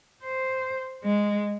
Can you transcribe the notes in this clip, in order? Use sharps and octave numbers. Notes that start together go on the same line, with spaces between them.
C5
G#3